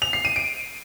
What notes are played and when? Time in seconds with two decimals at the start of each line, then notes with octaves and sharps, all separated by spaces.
0.02 F7
0.13 C7
0.25 D#7
0.36 D7